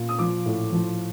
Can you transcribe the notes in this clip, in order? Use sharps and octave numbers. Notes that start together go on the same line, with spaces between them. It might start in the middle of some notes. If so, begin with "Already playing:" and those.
Already playing: A#2
D#6
F3 D6
A2
F3